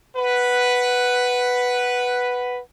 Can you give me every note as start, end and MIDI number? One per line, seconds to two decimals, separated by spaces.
0.16 2.60 71
0.16 2.60 78